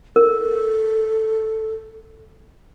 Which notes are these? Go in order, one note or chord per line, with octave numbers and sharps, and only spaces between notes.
A4 A#4